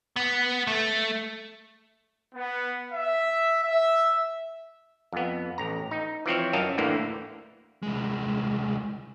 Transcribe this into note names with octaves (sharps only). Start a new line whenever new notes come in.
B3
A3
B3
E5
E5
F2 B3
A1 A#5
D#4
E3 F3 C4 C#5
F#2 A#4 C#5 D#5 F5 A5
D2 A2 D3 E3 A#3
C2 G#3